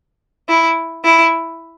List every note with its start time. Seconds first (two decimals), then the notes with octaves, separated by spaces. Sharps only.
0.49 E4
1.05 E4